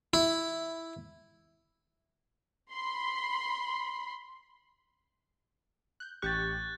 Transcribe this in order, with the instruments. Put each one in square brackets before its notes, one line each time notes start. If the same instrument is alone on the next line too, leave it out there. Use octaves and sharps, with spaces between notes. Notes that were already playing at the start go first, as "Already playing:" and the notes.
[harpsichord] E4
[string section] B5 C6
[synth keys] F#6 G6
[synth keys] A1 G4 C#6 [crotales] F#6 G6 A6